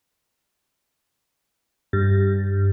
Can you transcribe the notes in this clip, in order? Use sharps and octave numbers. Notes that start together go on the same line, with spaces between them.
G2